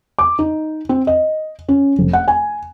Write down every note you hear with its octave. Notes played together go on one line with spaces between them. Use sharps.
D6
D#4
C4
D#5
C#4
F1
F#5
G#5